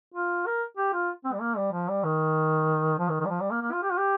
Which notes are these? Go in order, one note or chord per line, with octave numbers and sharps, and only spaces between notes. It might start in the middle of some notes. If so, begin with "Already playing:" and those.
F4
A#4
G4
F4
C4
G3
A#3
G3
F3
G3
D#3
F3
D#3
D#3
G3
F3
G3
A#3
A#3
F4
G4
F4
G4